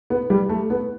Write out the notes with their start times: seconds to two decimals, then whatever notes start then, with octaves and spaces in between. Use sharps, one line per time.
0.10 B3
0.30 G3
0.49 A3
0.70 B3